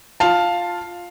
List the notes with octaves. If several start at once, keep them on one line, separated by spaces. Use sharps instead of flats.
F4 F5 A5